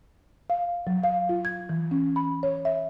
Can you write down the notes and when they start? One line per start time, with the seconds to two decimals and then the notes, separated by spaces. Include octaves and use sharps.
0.50 F5
0.87 F#3
1.04 F5
1.29 F4
1.45 G#6
1.69 E3
1.91 C#4
2.16 B5
2.43 C#5
2.65 E5